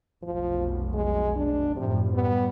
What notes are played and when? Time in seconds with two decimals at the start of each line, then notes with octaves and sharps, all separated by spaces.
0.23 F1 B1 F3
0.93 G#3
1.36 D4
1.76 F#2 A2 C3 F3
2.14 G3 B3